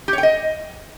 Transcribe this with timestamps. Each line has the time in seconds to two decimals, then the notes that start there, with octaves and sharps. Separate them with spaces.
0.08 G4
0.13 C#5
0.18 G5
0.23 D#5